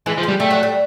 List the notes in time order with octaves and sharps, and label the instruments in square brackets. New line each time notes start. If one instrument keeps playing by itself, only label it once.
[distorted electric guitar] E3 [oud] G#3
[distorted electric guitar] F3
[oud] G#3
[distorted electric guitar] G3
[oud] G3 [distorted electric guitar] A3
[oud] F#3
G3